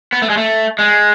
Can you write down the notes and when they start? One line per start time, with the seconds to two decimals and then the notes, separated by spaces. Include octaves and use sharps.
0.13 B3
0.22 A3
0.30 G#3
0.37 A3
0.79 G#3